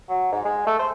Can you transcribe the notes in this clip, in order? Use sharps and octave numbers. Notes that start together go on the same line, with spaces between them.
F#3
G#2
G#3
A3
C5